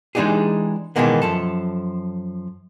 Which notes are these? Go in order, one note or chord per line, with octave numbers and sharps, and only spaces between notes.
E3 G#3 D4 D#4 G4 G#4
B2 D#3 E3 G#3 A#3 B3
F#2 F3 A4